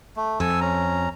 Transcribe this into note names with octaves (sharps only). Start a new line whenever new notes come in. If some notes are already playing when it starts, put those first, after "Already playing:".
A3
F2 A4 G#5 E6
C#4 A#5